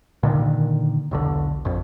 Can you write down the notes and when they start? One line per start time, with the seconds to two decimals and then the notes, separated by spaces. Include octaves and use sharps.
0.23 A#2 D3 D#3
1.11 E1 B1 D3
1.65 A#1 F2